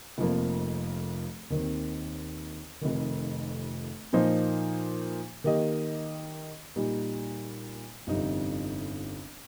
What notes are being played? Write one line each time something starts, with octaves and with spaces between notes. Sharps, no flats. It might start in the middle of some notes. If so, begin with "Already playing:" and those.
F1 F2 F3 A#3
D#2 D#3 C4
F1 F2 D#3
A#2 F3 A#3 D#4 C5
D#3 A#3 G4 D#5
A#2 G3 D#4
G1 F2 C3 G3 D#4